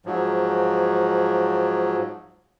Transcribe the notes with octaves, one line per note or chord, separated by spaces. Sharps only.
G#2 F3 F#3